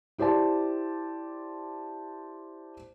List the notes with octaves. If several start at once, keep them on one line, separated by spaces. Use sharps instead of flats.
E4 G4 C5 D5 A5